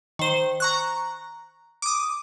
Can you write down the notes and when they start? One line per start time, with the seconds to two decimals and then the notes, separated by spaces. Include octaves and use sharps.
0.19 D#3 C5
0.60 A#5 C#6 F#6
1.82 D6 D#6